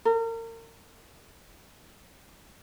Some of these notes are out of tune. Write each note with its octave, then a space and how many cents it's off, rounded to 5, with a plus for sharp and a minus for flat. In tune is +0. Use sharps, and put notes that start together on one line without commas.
A#4 -35